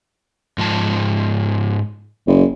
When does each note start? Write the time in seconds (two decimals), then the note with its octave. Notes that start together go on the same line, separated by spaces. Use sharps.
0.58 G#2 F3 A5
2.27 F#1